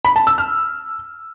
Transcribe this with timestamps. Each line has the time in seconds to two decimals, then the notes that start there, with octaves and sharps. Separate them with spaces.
0.05 B5
0.16 A5
0.27 E6
0.38 F6